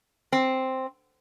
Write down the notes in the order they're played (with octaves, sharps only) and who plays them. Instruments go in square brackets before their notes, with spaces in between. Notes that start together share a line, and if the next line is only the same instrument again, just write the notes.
[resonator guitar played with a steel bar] C4